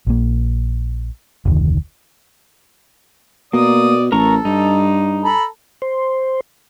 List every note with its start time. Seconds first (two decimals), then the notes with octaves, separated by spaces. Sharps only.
0.07 A#1 A#3
1.45 F1 D2 D#3
3.53 B2 A#3 D5 D#6
4.12 A1 A4 A#4 A#5 C#6
4.45 G2 D#4
5.24 A4 A#5 B5
5.82 C5